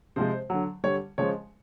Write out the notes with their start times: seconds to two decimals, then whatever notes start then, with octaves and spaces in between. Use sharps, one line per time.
0.16 C3 F3 G#3 C5
0.50 D3 F#3
0.84 D3 G3 C#5
1.18 C#3 F3 G#3 C#5